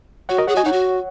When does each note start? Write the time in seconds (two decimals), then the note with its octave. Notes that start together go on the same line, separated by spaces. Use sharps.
0.29 F#4 C#5 F#5
0.38 A#4 D#5
0.47 G#4 C#5 F#5
0.56 F#4 D#5 G#5
0.64 D#4 C#5 F#5
0.72 F#4